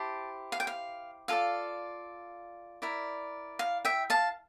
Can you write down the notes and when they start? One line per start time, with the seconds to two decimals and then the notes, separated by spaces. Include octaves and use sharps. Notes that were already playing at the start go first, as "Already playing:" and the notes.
Already playing: E4 G4 C5 A5
0.52 F5
0.60 G5
0.67 F5
1.28 F4 A4 D5 F5
2.82 E4 A#4 D5
3.59 F5
3.85 E5 G5
4.10 F5 A5